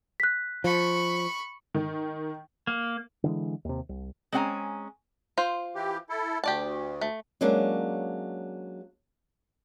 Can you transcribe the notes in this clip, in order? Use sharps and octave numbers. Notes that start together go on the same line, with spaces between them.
F#6 B6
F3 B5 C#6
D#3
A#3
D3 E3 G#3
D#2 C3
C2
G#3 C4 C#4 F#5 G#5 A#5
F4 C5
E3 G4
E4 A4
D2 G4 D5 A5
A3
F#3 G#3 A#3 C#4 D4